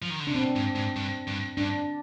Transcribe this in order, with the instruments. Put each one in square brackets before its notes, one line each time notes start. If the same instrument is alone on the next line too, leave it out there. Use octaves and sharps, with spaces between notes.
[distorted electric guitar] F3
D#3
D3
[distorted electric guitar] C3 [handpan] D4
[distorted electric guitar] B2 [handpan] C4
[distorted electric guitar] G#2
G#2
G2
G2
[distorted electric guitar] G2 [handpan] D4